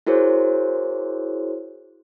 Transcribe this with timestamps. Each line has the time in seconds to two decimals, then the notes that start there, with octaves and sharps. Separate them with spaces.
0.07 E4 F#4 G#4 A#4 C5 C#5